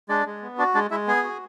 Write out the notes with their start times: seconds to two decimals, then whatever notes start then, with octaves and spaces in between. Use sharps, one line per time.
0.09 G#3 D4 D5
0.26 G#3
0.42 B3
0.58 D4 F#4 D5
0.74 G#3 D4 D5
0.91 G#3 E4 E5
1.07 B3 G#4 G#5
1.23 F#4